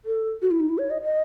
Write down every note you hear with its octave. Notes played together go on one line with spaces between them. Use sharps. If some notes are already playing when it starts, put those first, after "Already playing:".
A4
F#4
E4
D#4
E4
C#5
D#5
D#5